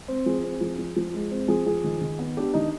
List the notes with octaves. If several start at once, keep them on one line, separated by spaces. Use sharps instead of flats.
C4
F3 G#4
C4
F3
F3
F3
G#3
C4
F3 G#4
F3 G#4
D#3
D#3
B3
D4 G4
D#3 D#4